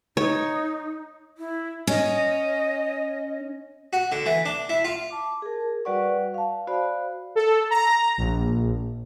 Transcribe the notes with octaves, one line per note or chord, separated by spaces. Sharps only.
D#4 C#5
E4
C#4 D#5
F#4
D3
E3
D4
E4
F4
A5 D6
G#4 A#4
G3 F#4 B4 D5 F#5 C#6
F5 A5
F#4 C5 D5 F5 B5
A4
A#5
A#1